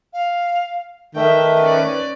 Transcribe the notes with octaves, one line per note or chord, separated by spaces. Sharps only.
F5
D#3 A3 B4 E5 G5
C#4 D5